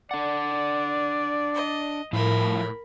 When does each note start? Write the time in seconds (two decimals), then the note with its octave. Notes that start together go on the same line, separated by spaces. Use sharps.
0.11 D4 D5 F#5
1.55 D#5
2.13 A2 F3 E4 F4 A#4 B5